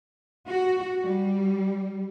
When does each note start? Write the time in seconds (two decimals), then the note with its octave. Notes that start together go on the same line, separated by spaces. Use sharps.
0.48 F#4
1.03 G3